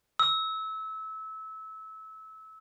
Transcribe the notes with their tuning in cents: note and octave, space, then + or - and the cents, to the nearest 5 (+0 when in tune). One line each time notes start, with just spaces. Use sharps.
E6 -25